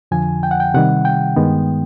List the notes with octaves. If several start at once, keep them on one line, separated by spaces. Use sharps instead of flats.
F2 D3 F3 G#5
G5
F#5
G5
C3 D#3 G3 F#5
G5
G2 D#3 G#3 B3